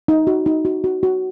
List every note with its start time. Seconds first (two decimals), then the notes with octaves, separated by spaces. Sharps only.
0.08 D#4
0.27 F#4
0.46 D#4
0.65 F#4
0.84 F#4
1.03 F#4